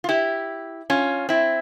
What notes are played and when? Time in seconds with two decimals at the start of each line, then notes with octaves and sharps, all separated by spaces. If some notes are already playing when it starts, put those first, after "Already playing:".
0.04 F4
0.09 E4 G4
0.90 C#4 F4
1.29 C4 E4